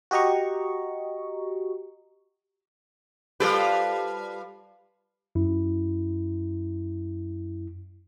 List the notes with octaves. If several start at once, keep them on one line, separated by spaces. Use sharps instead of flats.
F#4 G4 D#5 A#5 C#6
G3 F4 G4 A4 B4 C5
F#2 E4